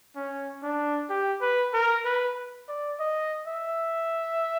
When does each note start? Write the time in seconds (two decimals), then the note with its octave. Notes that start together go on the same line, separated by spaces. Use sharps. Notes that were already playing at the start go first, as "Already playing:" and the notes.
0.16 C#4
0.63 D4
1.10 G4
1.42 B4
1.74 A#4
2.05 B4
2.69 D5
3.00 D#5
3.47 E5